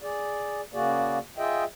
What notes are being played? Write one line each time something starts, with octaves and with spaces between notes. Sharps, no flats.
G#4 D5
C#3 A#3 F#4 G#4 D5
F4 G#4 D#5 E5 G5